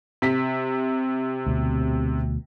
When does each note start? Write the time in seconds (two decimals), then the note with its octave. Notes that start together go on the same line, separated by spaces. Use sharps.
0.22 C3 B6
1.46 D2 B2